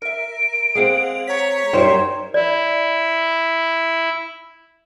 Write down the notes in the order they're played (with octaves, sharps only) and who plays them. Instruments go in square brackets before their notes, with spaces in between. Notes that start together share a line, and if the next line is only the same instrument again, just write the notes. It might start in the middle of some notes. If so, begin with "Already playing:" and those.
[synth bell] A#4 E5 [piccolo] D7
[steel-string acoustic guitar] G#3 C4 [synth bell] G#4 F5 F#5
[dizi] C#5 [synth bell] A#5 B6
[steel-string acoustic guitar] F#2 G3 [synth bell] D#4 A#4 C5 [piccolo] C6
[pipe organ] E4 [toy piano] D5